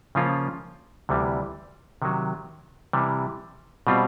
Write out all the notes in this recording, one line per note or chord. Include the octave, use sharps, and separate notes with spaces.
C#3 F3 A#3 C#4 F4
D2 C3 E3 G3
C3 D#3 F#3
C3 E3 G3
B2 G3 C4 F4